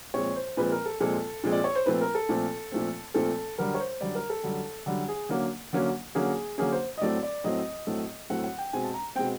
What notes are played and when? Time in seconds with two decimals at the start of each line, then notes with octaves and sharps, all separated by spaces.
0.14 A#2 F3 G#3 C4 C#5
0.36 C5
0.57 A#2 F3 G#3 C4 B4
0.72 A#4
0.86 A4
1.00 A#2 F3 G#3 C4 A4
1.44 A#2 F3 G#3 C4
1.52 D5
1.64 C#5
1.75 C5
1.86 A#2 F3 A3 C4 B4
2.01 A#4
2.15 A4
2.29 A#2 F3 A3 C4
2.72 A#2 F3 A3 C4
3.14 A#2 F3 A3 C4 A4
3.58 F#2 D3 G3 A#4
3.74 C#5
3.80 C5
4.01 F#2 D3 G3 D5
4.15 A#4
4.30 A4
4.44 F#2 D3 G3
4.86 F#2 D3 G3
5.08 G#4
5.29 D3 F#3 A#3 C#4
5.73 D3 F#3 A#3 C#4
6.15 D3 F#3 A#3 C#4 G#4
6.58 D3 F#3 A#3 C#4 G#4
6.72 C5
6.98 D#5
7.01 A2 F#3 A3 C4 D5
7.23 D5
7.44 A2 F#3 A3 C4 D#5
7.87 A2 F#3 A3 C4
8.30 A2 F#3 A3 C4 F#5
8.44 F#5
8.58 G5
8.73 B2 G#3 C4 G#5
8.84 A5
8.94 A#5
9.15 B2 G#3 C4 G5